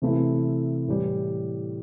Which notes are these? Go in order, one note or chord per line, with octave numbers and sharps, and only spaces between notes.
C3 E3 A3 C4 E4
A2 E3 G3